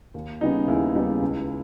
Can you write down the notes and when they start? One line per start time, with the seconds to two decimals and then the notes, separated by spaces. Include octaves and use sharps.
0.14 D#2
0.41 C#3 G3 B3 D#4
0.68 D#2 E4 G#4
0.95 C#3 G3 B3 D#4
1.22 C#2